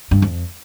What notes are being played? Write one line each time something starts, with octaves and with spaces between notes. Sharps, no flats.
G2
F2